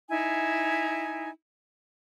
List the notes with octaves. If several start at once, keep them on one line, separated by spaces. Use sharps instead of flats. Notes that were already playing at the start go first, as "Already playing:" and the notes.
D#4 E4 G#5